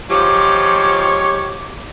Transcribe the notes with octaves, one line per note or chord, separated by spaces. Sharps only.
G#2 F3 G4 C#5 D6